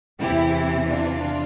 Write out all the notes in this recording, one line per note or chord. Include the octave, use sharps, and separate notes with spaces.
E2 C3 E3 E4 G4
D4 F4